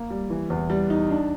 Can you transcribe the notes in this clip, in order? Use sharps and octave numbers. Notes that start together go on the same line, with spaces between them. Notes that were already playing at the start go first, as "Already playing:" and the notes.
Already playing: A#3
G3
E3
E2
G3
D#4
D4